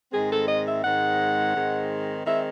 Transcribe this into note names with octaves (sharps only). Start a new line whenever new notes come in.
G#2 D#3 G#3 C4 G#4
A4
D#5
E5
G#2 D#3 G#3 C4 F#5
G#2 D#3 G#3 C4
D#3 G#3 C4 E5